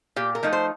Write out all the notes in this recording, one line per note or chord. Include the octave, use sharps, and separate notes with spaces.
A#2 G4
A#4
F3 A3 D#4
C5